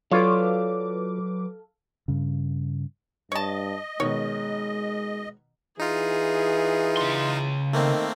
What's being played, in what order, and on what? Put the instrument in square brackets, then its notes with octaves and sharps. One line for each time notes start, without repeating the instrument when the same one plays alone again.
[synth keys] F#3 B4 D6 [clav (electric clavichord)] F4 C#5 [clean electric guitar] A4 D5 F5
[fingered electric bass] G2 C#3
[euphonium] G2 [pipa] C#5 A5 [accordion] D#5
[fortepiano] B2 D#3 [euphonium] G#3 [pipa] C#5
[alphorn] E3 [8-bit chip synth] D#4 F4 [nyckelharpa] G#4
[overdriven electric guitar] C#3 C6
[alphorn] D#3 [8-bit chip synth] A3 A#3 C4